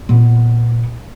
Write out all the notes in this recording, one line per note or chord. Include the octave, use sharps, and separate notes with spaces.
A#2 B3